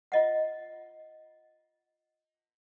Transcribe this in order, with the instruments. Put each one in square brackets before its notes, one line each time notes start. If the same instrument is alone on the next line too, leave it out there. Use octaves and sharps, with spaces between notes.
[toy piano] F4 D#5 F#5